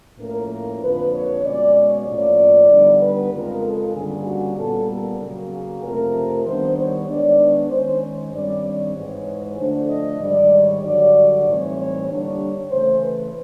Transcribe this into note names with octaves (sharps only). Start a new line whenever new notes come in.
A2 F3 A#3 C#4 A#4
A#4
F2 D3 F3 A#3 B4
C#5
B2 G#3 C#4 D5
C#5
A2 F3 A#3 C#4 D5
D3 G3 B3 D#4
B4
F2 C#3 F3 G#3 A#4
A4
G2 D3 G3 A#3 C#4 G#4
F#4
A#2 G3 B3 A4
A#4
C#3 F#3 A#3
G#4
F2 C3 F3 A3 A#4
D#3 G3 B3 D4 C5
C#5
D#3 G#3 B3 D4 D5
C#5
D#3 G#3 C#4 C5
C#5
G2 D#3 G3 C4 D5
C#5
G#2 E3 G#3
D3 F3 A3 D4 C5
D#5
G#2 D#3 G3 D5
C#5
G2 D3 F#3 D5
D5
A2 E3 G3 C4 D#4 C#5
C#5
D3 G3 A#3 D4 C#5
C#3 E3 A3 C5
B4